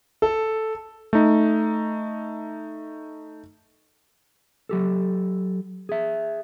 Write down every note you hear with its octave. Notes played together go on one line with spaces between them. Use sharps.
A4
A3 D#4
F#3 G4 A4
G#4 E5